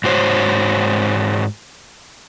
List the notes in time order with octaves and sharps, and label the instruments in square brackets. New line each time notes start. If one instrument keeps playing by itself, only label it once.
[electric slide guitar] G#2 F#4 C5 C#5